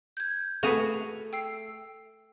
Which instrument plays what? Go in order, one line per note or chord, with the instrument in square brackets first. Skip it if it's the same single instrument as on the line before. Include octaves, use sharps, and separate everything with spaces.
[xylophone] G6 G#6
[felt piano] A3 [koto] F#4 G#4 B4 [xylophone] F7
[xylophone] G5 E6 C7